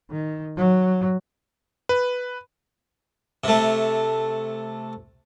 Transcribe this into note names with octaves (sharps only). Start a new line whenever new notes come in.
D#3
F#3
B4
C3 A3